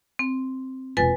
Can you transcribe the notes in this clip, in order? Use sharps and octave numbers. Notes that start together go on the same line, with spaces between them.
C4
E1 F4 B4 G#5 A6